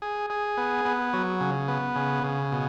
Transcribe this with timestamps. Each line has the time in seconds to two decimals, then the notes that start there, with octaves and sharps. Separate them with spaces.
0.02 G#4
0.30 G#4
0.57 B3
0.85 B3
1.13 F#3
1.41 C#3
1.68 B3
1.96 C#3
2.23 C#3
2.52 B2